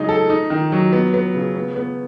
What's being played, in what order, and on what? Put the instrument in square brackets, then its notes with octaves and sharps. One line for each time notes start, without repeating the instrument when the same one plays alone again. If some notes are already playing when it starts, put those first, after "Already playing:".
Already playing: [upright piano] C#3 F#3 G#3 D#4
A4
D#4
D#3
F#3
B3
B3
C#3
B3
B3